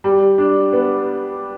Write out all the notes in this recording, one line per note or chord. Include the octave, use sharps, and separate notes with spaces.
G3
D4
B3